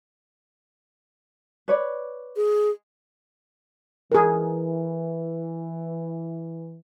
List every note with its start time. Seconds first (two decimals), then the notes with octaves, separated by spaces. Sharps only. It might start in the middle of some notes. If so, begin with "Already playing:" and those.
1.68 B4 C#5 D5
2.36 G#4
4.12 E3 G#4 A#4